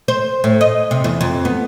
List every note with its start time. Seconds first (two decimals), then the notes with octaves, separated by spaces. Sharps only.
0.08 C5
0.44 A2
0.61 D#5
0.91 C3
1.04 E2
1.21 F2
1.45 B3